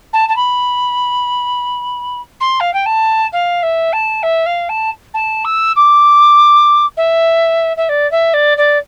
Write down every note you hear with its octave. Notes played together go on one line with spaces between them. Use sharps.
A5
A5
B5
C6
F5
G5
A5
F5
E5
A5
E5
F5
A5
A5
E6
D6
E5
E5
D5
E5
D5
D5